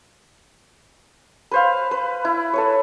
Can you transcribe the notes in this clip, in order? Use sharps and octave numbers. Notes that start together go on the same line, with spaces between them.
B4 C5 F5
B4
E4
A4 B4 C#5